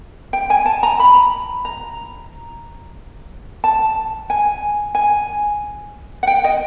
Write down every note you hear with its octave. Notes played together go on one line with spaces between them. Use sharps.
G5
G#5
A5
A#5
B5
A#5
A5
G#5
G#5
F#5
G5
D#5